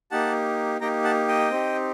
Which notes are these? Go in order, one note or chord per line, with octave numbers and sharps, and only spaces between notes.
A#3 D#4 G4 F#5 A5
A#3 D#4 G4 G5 A#5
F#5 A5
D#5 G5
C4 D#4 G4